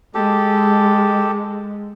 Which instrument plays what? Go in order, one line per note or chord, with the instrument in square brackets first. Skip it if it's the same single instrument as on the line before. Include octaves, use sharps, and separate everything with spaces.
[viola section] G#3 [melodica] G4 A4